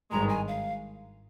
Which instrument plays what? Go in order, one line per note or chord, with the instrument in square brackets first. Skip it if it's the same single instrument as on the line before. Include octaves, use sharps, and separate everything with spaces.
[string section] G#1 G2 D#3 G#3 [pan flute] A#5
[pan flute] G#5
F5